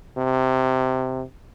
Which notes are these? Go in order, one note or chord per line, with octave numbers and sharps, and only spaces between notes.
C3